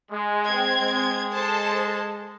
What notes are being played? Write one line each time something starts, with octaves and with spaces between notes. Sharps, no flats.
G#3
C4 G#6
G#3
A4 C5 A5